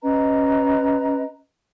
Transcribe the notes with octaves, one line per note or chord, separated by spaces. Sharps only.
C#4 B4 D#5 A#5